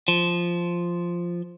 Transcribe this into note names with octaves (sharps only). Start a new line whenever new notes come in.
F3